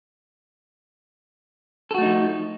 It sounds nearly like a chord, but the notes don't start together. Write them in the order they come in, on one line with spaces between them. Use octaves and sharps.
A4 F#4 A3 D#4 F3